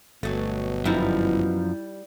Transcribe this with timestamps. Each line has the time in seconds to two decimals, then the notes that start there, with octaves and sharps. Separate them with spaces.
0.23 G1 B2 F#3 A3
0.85 F#2 F3 G3 D#4 E4